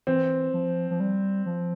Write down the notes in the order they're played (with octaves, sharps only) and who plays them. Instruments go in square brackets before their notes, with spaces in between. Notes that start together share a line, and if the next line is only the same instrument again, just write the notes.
[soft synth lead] E3 [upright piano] C4
[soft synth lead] F3
F3
G3
F3